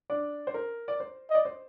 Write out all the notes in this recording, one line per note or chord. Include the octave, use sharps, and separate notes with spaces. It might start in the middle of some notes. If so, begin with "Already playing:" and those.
D4 D5
C5
A#4
D5
C5
D#5
D5
C5